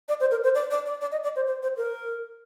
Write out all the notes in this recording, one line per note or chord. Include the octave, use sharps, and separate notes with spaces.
D5
C5
A#4
C5
D5
D5
D5
D5
D#5
D5
C5
C5
C5
A#4